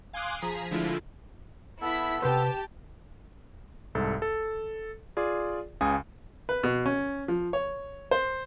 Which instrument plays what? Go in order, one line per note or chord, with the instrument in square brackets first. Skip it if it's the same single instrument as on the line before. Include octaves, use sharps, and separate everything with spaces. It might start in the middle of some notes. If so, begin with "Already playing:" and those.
[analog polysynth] F5 G#5 C6 D6 D#6 F#6
F3 G#4 A#5 B6
D3 F3 G#3 A3 E4 F4
[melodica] B3 A4 [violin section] E4 B6
[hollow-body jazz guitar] C3 B4 C5 [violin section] G4 A5
[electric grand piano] C2 G#2 A4
A4
F4 G#4 D5
C#2 C#3 G#5 D#6
[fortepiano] B4
B2
C#4
F3
C#5
C5